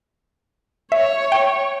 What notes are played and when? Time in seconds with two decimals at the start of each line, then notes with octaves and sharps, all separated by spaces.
0.92 C#5 E5
1.32 G5